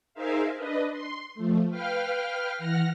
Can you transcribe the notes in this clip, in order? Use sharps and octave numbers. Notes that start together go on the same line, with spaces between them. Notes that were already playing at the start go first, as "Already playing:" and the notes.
D#4 G#4 A#4 C5 E5 F5
D4 B4 D#5
C6
F3 A3
B4 F5 G5 F6
E3 F#5 F6 A#6